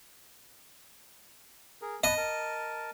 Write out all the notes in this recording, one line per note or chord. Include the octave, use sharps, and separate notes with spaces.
G#4 A#4
D#5 A5 B5 F#6
A#4 A5